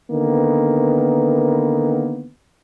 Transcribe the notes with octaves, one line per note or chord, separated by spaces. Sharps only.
D3 D#3 A#3 B3